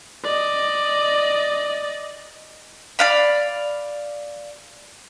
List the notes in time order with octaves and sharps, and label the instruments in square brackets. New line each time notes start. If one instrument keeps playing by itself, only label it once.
[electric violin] D5 D#5
[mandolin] D5 F5 B5